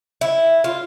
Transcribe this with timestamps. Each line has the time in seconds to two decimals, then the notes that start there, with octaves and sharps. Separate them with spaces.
0.21 E4
0.64 F4